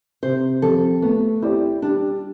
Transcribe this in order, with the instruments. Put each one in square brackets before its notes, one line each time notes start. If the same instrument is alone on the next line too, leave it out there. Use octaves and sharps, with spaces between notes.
[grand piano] C3 [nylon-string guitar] C5
[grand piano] F3 C4 G4 [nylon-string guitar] A4
[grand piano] A3 [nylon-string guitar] B3
[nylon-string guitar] C4 [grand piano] E4 G4 D5
[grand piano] G3 [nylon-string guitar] D4